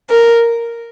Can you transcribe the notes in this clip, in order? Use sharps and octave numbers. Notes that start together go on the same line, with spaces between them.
A#4